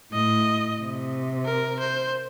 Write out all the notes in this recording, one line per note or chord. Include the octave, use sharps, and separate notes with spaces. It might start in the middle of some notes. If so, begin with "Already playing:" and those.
A2 D#5
C3
A#4
C5